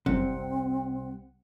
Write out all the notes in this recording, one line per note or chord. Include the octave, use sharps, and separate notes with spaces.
G1 C2 F#2 C3 G3 C4 F#5